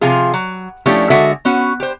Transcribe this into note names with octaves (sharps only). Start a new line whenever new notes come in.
C3 F3 F4 G#4
F#3
F3 A3 C#4 D4 E4 G4
D3 G#3 F#4 A4 E5
B3 C#4 F#4
G4 C5